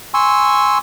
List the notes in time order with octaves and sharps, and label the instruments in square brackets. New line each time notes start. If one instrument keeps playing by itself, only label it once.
[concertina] G#5 C6 C#6 E6